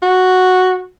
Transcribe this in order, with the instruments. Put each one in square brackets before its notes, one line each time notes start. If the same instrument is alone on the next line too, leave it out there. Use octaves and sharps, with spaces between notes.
[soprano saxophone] F#4